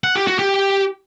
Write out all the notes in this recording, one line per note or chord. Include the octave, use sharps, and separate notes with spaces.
F#5
G4
F#4
G4